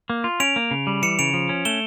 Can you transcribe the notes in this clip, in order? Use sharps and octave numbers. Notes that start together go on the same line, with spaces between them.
A#3
F4
C#4 D7 F7
A#3
C#3
G3
E3 C#7 E7
C#3 D7 F7
F3
C#4
A3 E7 G7